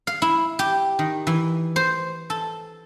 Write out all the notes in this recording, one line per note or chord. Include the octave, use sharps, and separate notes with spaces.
F5
E4
G4
D#3
E3
C5
A4